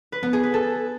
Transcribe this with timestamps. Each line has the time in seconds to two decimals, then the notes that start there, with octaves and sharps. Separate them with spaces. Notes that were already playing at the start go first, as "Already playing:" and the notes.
0.12 B4
0.23 B3
0.33 G#4
0.43 B4
0.54 A4